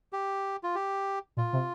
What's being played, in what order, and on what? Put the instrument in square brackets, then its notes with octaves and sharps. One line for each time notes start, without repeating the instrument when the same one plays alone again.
[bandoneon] G4
F4
G4
[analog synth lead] A#2 [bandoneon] F4
[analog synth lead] C3